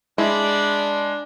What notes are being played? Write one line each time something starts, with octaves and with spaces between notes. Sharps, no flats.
G#3 D4 E4 D5 B5